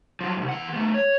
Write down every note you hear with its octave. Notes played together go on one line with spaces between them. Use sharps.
F3 F#3
C2 G2
E3 F#5
A3 B3
C#5